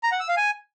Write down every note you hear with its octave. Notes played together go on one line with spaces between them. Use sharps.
A#5
F#5
E6
F5
G#5